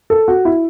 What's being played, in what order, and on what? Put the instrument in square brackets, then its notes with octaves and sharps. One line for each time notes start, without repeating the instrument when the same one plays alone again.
[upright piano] A4
F#4
E4